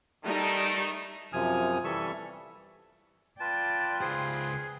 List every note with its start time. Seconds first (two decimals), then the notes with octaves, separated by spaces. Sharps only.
0.24 D#3 G3 A3 D#4
1.33 F#2 C3 F3 G#5 D#6 F6
1.84 E3 G3 A4 E5 C#6 E6
3.40 F4 B4 D5 G5 A5
4.02 C#2 G#4 C5